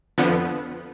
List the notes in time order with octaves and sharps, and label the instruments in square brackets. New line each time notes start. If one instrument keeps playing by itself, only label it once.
[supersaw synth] F2 D3 F3 B3